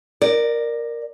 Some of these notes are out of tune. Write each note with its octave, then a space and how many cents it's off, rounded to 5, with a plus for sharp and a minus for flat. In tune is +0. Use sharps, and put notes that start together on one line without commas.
A#4 +0 D5 +20